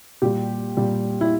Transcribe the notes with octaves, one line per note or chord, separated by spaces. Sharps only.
A#2 G3 G4
A#2 G3
E4